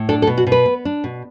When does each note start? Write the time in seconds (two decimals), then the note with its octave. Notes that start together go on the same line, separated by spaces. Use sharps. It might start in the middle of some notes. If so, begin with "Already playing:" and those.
Already playing: A2
0.09 D4 A4
0.22 A4
0.27 B2
0.38 F#4
0.47 B2
0.52 B4
0.66 B3
0.85 D4
1.04 B2